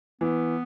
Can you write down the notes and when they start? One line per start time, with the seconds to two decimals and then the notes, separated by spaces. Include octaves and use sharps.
0.21 E3 B3